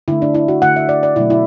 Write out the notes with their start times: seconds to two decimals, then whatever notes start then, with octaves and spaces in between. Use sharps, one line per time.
0.08 D3 A3 E4
0.22 D4
0.34 E4
0.48 F#4
0.62 D3 A3 F#5
0.76 E5
0.89 D5
1.03 D5
1.16 B2 F#3 A3 E4
1.30 E4